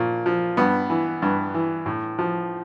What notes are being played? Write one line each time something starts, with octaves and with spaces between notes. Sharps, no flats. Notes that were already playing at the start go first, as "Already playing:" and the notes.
Already playing: A#2 F3
F3
G2 B3
E3
G2
E3
A2
F3